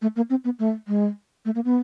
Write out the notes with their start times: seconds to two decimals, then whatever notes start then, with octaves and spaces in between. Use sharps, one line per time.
0.02 A3
0.16 A#3
0.30 C4
0.44 B3
0.59 A3
0.88 G#3
1.45 A3
1.55 A#3
1.65 B3